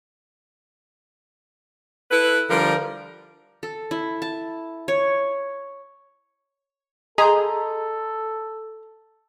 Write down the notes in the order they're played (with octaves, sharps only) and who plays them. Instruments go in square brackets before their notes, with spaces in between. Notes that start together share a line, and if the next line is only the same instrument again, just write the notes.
[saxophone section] E4 A4 B4
D3 F3 G3 A#4
[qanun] A4
E4
A5
C#5
[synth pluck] G#4 [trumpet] A4 [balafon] D#5 [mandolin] A#5 C6 G6